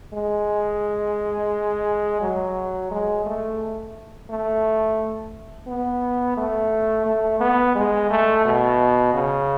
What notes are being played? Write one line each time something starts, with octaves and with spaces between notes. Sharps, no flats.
G#3
F#3
G#3
A3
A3
B3
A3
A3
B3
G#3
A3
B2
C#3